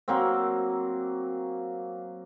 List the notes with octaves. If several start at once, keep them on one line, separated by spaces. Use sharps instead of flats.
F#3 A#3 C4